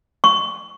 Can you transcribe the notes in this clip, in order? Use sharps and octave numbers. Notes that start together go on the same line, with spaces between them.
C#6